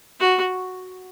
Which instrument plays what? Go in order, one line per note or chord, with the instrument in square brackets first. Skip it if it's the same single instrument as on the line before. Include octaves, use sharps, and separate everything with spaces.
[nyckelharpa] F#4